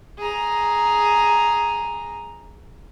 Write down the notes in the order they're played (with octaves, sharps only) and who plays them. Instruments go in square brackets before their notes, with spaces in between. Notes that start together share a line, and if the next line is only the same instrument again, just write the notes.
[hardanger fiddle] G#4 A#5